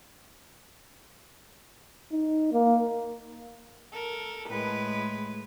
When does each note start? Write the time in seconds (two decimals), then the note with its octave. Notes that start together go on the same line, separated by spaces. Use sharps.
2.12 D#4
2.52 A#3
3.93 A4 A#4
4.48 A2 G#3 B4